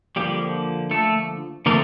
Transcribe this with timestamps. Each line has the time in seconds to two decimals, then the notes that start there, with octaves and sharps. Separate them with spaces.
0.16 D3 F3 G3 A#3 G4
0.91 A3 A4
1.66 D3 F3 A3 A#3 C4 A#4